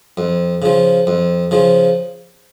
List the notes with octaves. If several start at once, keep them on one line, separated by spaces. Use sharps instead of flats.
F2
C#3 F3
F2
C#3 F3